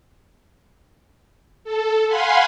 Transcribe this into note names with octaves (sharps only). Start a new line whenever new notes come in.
A4
F5 F#5 G#5 B5 C6